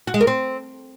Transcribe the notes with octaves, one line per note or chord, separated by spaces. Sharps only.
F#4
G#3
A#4
C4